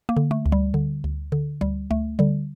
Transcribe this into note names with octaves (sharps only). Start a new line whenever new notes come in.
A#3
D3
A3
D2
G3
D3
D2
D3
D2 G3
D2 A3
D3 G3